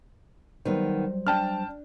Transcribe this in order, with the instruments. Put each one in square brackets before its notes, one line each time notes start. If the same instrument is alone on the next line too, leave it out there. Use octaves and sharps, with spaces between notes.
[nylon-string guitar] D#3 B3 [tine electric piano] F#3 G3 C5
[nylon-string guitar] D4 [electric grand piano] G5 A5 F6